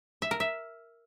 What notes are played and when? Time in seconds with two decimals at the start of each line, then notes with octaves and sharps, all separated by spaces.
0.22 E5
0.31 A#4
0.40 E5